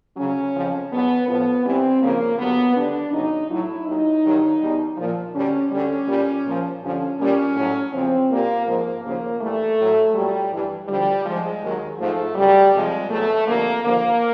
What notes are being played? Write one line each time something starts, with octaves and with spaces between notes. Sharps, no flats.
D2 C#3 F#3 C#4
F2 C#3 F3
E2 B2 F#3 B3
A2 F3 B3
G2 E3 G3 C4
D#2 C#3 F3 A#3
G2 D3 F#3 B3
D#2 D3 G3 D4
E2 C#3 F#3 D#4
A2 F#3 E4
D#2 D#3 F#3 D#4
G2 D#3 F#3
E2 B2 G3
A#2 F3
D2 D3 G3 C#4
D2 D3 G3 C#4
A#2 G3
A#2 F3
G2 D3 F3 C#4
A#2 G3 C#4
A2 F#3
E2 C#3 F3 C4
A#2 G3 A#3
G#2 F3 A#3
D#2 C#3 F3 A#3
G2 E3 G3 A3
A2 F#3
A#2 F#3 G3
G2 E3 G3
D2 D3 F3 G3
G#2 F3 G#3
D#2 D#3 F#3
G#2 F3 A3
F#2 C#3 F#3 G3
F2 C3 F3 G#3
E2 B2 F#3 A3
F2 D3 G3 A#3
D#2 D3 F3 A#3